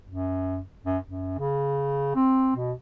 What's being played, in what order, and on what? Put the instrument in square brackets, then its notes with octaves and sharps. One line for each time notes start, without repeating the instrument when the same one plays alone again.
[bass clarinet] F#2
F#2
F#2
C#3
C4
B2